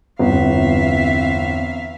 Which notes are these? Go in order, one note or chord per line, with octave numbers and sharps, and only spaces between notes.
G1 E2 C4 E5 F5